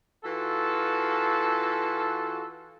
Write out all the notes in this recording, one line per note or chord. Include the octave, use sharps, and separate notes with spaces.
E3 F4 F#4 A4